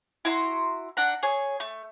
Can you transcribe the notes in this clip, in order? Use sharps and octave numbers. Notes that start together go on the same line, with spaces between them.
E4 F#4 A#5 C6
D4 F#5 A#5
G#4 C#5
A3